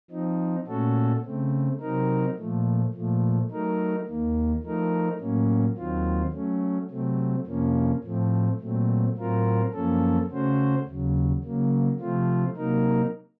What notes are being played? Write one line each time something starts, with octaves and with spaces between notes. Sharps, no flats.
F3 C4 D#4
A#2 A3 C#4 F#4 A4
C#3 A3 C4
C3 F#3 C4 D#4 A#4
A#2 F3 A3
A#2 F3 A3
F#3 A3 D#4 A#4
D#2 D#3 A#3
F3 A3 D#4 A#4
A2 F#3 A#3 C#4
D#2 D#3 F#3 C4 F4
F#3 A3 C#4
C3 F#3 A3 C4
F2 C3 F3 A#3 C#4
A2 F3 A3 C4
A#2 F#3 A3 C4
A2 F#3 C4 F4 A#4
F#2 F3 A#3 C#4 A4
C#3 A3 C#4 F#4 C5
D#2 C#3 F#3
C#3 F#3 A#3
C3 F3 A3 C4 F4
C3 F#3 A#3 D#4 A#4